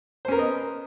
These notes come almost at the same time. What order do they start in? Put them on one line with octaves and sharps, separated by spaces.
C5 C#4 A#4 B3 D#5